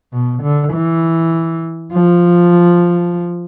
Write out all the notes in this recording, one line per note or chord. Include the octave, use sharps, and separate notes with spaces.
B2
D3
E3
F3